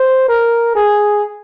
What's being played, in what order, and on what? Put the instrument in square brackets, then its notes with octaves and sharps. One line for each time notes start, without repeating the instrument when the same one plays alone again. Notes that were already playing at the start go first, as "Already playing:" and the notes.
Already playing: [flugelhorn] C5
A#4
G#4